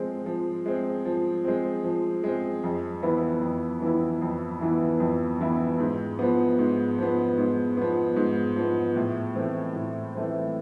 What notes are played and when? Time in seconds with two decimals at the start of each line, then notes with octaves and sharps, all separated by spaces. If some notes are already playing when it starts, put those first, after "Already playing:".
Already playing: F3 G#3 C4
0.26 F3
0.66 G#3 C4
1.05 F3
1.45 G#3 C4
1.84 F3
2.24 G#3 C4
2.64 F2
3.03 E3 B3 E4
3.42 F2
3.82 E3 B3 E4
4.22 F2
4.61 E3 B3 E4
5.00 F2
5.41 E3 B3 E4
5.79 G#2
6.19 F3 B3
6.59 G#2
6.98 F3 B3
7.38 G#2
7.77 F3 B3
8.16 G#2
8.56 F3 B3
8.96 A2
9.35 E3 A3 C4
9.76 A2
10.15 E3 A3 C4